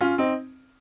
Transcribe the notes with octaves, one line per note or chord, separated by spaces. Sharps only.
C#4 F4
C4 D#4